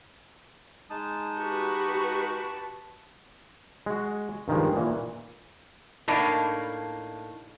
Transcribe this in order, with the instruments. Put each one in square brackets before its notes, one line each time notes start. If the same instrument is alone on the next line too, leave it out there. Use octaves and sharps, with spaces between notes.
[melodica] G#3 D#4 D#6 [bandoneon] A5
[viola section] F#4 G4 B4
[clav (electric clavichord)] G#3 F#4
G2 D#3 F3 G#3
A#2 E3
[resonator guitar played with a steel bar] A2 A#3 [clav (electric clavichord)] D4 D#4 [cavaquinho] D5 A5 B5